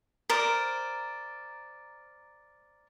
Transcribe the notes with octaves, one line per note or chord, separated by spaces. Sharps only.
A#4 C5 D5